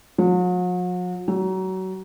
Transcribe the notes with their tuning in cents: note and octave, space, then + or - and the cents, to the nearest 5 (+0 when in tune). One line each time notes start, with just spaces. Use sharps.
F#3 -45
F#3 +25